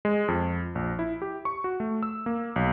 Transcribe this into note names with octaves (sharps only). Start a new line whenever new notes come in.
G#3
F2
A#1
E4
G4
C#6
F#4
A3
E6
A#3
B1